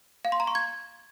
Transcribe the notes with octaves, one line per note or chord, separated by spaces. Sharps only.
F5
C6
A#5
C#6
G#6